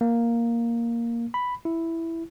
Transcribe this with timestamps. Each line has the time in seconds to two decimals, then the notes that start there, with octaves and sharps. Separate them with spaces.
0.01 A#3
1.34 B5
1.65 E4